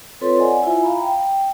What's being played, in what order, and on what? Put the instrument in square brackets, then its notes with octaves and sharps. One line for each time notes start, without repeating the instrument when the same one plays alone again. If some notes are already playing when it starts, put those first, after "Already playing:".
[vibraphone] C4 F4 A4 B4 C#5 C6
C5 D5 D#5 F#5 G#5
E4 F4 E5 G#5
F5 A#5 B5
G5